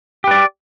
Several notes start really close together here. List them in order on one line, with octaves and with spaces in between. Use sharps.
G4 B4 D5